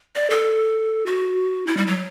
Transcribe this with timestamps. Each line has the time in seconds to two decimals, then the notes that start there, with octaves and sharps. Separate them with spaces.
0.15 D5
0.30 A4
1.06 F#4
1.67 E4
1.77 G3
1.87 F#3